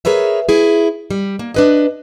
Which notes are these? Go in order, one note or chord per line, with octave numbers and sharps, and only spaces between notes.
G#4 A#4 B4 C#5 E5
E4 G#4
G3
A#3
D4 B4 D#5